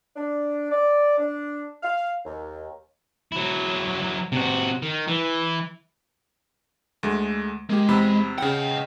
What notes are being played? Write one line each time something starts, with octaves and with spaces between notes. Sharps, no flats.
D4
D5
D4
F5
D#2
F#3 E4
C3 F#4
D#3
E3
D2 G#3 A3
G#3 A#3 G4
E2 C3 B5
C#3 D#5 F#5 G5